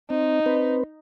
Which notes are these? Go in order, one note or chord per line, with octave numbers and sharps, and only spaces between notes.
C4 D#4
C4 B4